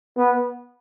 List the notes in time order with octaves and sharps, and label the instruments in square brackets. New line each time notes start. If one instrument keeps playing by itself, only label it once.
[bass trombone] B3